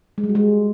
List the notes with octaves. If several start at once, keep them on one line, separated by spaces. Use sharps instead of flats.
G#3
G3
F#4
G#3